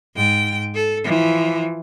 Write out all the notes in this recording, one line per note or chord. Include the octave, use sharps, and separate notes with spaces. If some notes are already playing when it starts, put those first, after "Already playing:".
G#2 G5
A4
E3 F3